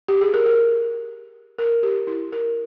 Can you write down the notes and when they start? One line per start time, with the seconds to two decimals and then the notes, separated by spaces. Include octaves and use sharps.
0.08 G4
0.21 G#4
0.34 A#4
0.46 A#4
1.58 A#4
1.83 G4
2.07 E4
2.32 A#4